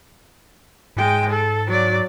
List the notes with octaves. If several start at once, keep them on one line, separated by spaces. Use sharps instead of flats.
G#2 G#3 G5
A4
F#3 D5